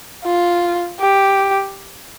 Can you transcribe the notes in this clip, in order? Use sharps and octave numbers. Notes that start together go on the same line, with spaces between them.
F4
G4